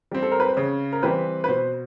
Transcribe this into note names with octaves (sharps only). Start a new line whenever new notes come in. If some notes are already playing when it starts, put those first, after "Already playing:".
G3 C4
A4
A#4
B4
C5
C#3 C#5
A#4
E3 G3 C4 B4
B4
B2 C5